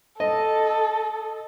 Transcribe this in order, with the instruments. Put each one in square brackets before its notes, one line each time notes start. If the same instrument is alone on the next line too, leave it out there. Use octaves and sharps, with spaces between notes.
[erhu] A4 [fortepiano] D#5